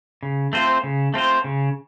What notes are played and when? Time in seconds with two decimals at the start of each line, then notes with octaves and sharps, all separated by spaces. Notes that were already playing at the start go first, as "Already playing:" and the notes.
0.23 C#3
0.53 A3 C4 F4 C5
0.84 C#3
1.14 A3 C4 F4 C5
1.44 C#3